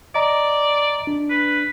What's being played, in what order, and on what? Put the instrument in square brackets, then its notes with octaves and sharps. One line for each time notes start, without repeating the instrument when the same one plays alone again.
[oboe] D5 [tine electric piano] D#5 A#5
[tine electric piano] D4
[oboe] B4